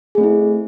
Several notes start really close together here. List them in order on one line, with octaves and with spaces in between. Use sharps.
G#4 A3 C4 E4